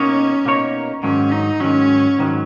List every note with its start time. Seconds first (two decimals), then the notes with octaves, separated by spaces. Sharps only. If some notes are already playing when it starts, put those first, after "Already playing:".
Already playing: B2 A#3 C#4 D#4 A#4 C#5
0.45 B2 A#3 D#4 A#4 C#5
1.03 G#2 D#3 F#3 C#4
1.32 D#4
1.60 G#2 D#3 F#3 C#4
2.19 G#2 D#3 F#3